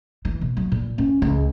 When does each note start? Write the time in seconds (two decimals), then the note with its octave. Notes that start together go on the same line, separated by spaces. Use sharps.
0.25 E3
0.41 B2
0.57 F#3
0.72 A#2
0.98 C#4
1.22 C#2